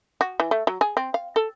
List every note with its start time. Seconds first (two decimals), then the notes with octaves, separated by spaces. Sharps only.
0.21 F#4
0.40 E3
0.51 A3
0.67 F#3
0.81 G#4
0.97 C4
1.14 F5
1.36 A4